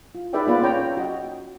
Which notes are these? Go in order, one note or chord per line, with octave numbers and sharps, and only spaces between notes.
F4
D#4 G#4 B4 D5 E5 G5
A#3 B3 F4 G#4 B4 D5
C#4 C#5 G5 A#5
F#4 D#5 G5